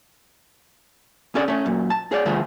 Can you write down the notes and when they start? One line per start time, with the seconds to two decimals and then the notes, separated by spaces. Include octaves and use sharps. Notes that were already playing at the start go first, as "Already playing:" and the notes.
1.35 C#4 D4 G#4 A4 D5
1.48 A3 C#4
1.66 F#2 A#2
1.90 A5
2.11 G#4 C#5 D5
2.25 G2 D3 F3 A3 F4 G#4